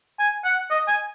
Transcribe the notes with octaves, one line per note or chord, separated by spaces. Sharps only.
G#5
F#5
D#5
G#5